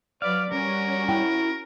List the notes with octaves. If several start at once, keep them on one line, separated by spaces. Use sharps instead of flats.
F#3 B4 D5 F5
G3 C#4 F#4 A#4
E4 G5